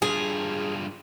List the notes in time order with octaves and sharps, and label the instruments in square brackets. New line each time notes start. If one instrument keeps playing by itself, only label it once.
[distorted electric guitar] G2 F4 [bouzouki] G#4